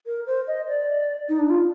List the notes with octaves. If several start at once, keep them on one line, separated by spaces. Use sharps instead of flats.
A#4
C5
D#5
D5
D#4
D4
F4